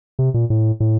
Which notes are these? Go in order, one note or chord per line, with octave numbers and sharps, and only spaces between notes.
C3
A#2
A2
A2